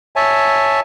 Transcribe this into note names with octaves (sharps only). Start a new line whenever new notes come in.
C#5 E5 G#5 A5